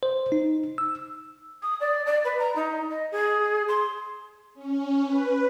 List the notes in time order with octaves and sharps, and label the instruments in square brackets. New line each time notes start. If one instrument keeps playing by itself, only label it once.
[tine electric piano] C5
D#4
E6
[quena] D#6
D5
D5
B4
A#5
D#4
D#5
G#4
C6
[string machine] C#4
B4